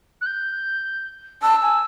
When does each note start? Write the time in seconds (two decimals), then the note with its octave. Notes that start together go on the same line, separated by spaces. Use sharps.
0.21 F#6
0.26 G6
1.42 A5 E6
1.62 G#5